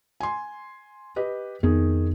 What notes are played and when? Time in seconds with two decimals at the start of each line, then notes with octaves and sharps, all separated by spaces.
0.20 G#5 C6
1.16 G4 B4 D#5
1.63 F2 D#3 B3 G#4